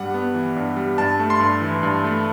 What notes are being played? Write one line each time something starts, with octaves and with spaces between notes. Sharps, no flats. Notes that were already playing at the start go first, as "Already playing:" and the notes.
Already playing: G2 G3 F#5
B3
E3
G2
G3
G2 A5
A3
C6
G2
E3
G2
A3